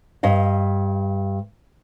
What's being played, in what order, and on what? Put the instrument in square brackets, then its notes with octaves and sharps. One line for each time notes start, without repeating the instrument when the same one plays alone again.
[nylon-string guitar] G2 D#5 F5